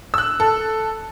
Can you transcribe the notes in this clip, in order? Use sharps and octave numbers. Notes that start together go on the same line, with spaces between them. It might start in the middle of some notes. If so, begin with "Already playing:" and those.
E6 F#6
A4